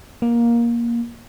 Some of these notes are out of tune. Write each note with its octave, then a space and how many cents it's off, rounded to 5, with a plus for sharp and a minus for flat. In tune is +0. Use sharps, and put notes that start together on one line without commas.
A#3 +15